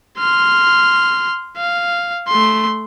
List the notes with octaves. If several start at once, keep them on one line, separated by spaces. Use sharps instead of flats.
C6 F6
F5
A3 C6